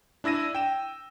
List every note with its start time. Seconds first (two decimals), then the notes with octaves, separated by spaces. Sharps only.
0.24 D4 E4 E6 A#6 D#7
0.55 G5 E7